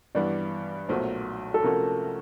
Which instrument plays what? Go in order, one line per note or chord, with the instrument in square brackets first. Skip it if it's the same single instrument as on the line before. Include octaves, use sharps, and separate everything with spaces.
[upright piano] G2 E3 G3 B3 [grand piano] D5
[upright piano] B1 A#2 F#3 A3 [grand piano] C5
[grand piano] A4
[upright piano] C3 F3 A3 C#4 F#4 [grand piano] A#4